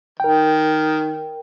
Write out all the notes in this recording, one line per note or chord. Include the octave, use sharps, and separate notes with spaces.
D#3 A#4 G5